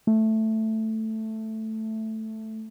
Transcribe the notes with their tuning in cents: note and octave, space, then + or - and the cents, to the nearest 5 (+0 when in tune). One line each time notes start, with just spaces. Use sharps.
A3 +0